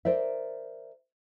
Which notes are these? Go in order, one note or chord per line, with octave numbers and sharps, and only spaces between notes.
A#4 C5 D5 E5